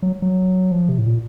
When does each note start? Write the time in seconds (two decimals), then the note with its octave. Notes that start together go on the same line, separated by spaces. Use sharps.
0.02 F#3
0.22 F#3
0.71 F3
0.89 C3
0.98 A2
1.07 A#2